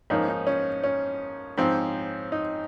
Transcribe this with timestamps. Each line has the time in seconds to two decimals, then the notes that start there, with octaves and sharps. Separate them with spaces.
0.10 G#2 F3 A#3 C#4 D#4
0.28 D#4
0.47 C#4
0.84 C#4
1.58 G#2 F3 C4
2.32 D#4